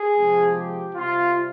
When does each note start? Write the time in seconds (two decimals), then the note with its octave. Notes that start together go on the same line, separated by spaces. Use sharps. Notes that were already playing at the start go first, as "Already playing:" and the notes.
Already playing: G#4
0.15 C3 F3 G#3
0.55 G4
0.95 C3 G3 F4